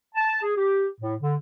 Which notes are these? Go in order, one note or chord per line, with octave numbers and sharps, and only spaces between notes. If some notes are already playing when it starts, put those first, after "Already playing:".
A5
G#4
G4
A2
D3